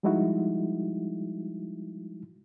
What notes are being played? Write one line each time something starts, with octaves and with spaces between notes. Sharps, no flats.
F3 G3 G#3 D#4 E4 F#4